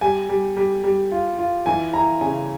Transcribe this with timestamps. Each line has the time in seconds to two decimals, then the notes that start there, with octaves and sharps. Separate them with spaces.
0.01 G3 G#5
0.29 G3
0.57 G3
0.84 G3
1.12 F4
1.39 F4
1.66 E3 G#5
1.93 E4 A#5
2.21 C#3 G#5